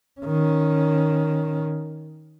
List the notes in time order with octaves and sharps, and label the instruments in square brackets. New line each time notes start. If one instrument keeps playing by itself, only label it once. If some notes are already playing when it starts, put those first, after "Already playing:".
[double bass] D#3 C#4